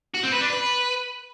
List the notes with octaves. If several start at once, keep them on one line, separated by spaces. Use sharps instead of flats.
F#4
C4
B4
D4
B4